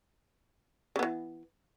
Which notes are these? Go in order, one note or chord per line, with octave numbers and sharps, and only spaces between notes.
C#3 E3 B3